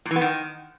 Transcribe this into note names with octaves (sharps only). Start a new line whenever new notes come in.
A#2
E3
B3
D#3